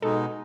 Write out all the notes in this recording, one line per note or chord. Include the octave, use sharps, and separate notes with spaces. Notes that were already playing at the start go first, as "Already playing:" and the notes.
B2 G#3 D#4 A4